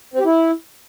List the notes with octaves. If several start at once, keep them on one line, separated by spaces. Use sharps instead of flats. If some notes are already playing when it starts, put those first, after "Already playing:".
C4
G4
E4